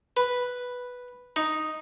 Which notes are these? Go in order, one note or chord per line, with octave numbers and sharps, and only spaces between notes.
B4
D#4